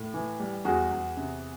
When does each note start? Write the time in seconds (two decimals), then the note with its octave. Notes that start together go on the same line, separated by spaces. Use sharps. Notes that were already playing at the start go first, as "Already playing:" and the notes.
Already playing: A2
0.14 E3
0.40 G3
0.65 E2 F#4 G#4
0.91 E2
1.17 C3